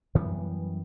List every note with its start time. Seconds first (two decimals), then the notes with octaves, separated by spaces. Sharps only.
0.15 F#2 E3 G3 B3